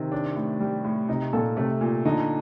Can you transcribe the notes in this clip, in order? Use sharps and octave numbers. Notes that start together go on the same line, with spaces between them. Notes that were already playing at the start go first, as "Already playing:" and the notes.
Already playing: C3 D#3
D4
A2
G3
A2
C3 D#4
A#2 A4
C3 A3
A#2
D3 D#4